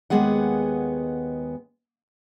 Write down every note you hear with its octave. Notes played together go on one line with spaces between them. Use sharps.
D#2 G#3 B3 G#4 F#5